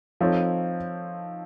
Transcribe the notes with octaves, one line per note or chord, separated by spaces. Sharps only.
F3 C4 D#4 A4 C#5